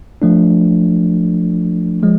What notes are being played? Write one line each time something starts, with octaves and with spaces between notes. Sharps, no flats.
F3 A3 D4
F3 G#3